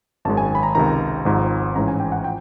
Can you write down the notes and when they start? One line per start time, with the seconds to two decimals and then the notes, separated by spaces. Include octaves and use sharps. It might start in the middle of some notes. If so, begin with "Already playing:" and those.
0.25 G#1 F#2 D#3 G#3 A5
0.37 G#5
0.55 B5
0.63 A#5
0.75 C#2 C3 D#3 A#5
1.25 G#1 G#2 F3
1.76 A1 G#2 E3 G#3 C#4 A#5
1.88 G#5
2.00 G5
2.12 F#5
2.24 F3 G5